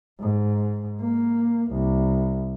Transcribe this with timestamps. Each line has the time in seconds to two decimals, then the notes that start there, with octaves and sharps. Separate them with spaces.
0.20 G#2
1.01 A#3
1.71 C2